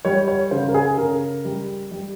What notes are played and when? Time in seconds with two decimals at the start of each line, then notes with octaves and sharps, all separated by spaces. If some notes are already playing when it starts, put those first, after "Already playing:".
0.05 G3 C#5
0.28 C#5
0.51 C#3 C5
0.69 A#4
0.74 G#4
0.97 C#3 A#4
1.45 G3
1.91 G3